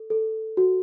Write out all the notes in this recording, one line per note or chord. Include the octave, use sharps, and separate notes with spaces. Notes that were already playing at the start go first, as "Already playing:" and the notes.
Already playing: A4
A4
F#4